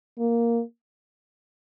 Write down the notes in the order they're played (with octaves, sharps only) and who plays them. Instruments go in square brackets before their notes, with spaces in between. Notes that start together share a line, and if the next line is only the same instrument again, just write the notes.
[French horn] A#3